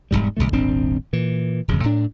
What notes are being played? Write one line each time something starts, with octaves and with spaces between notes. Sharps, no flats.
E1 D#2 G#2 G3
B1 E2 D3 A3
D#1 G#1 C4 D4
A#2 E3
D1 F2 C#3
A2 D4